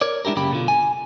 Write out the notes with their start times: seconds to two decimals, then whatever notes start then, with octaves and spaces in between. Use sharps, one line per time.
0.01 A#4 C#5 D5
0.25 G#3 D4 E4 G4 A#4
0.36 F#2 C#3 A#3 G4 B5
0.51 B2 D3 F4
0.68 G#5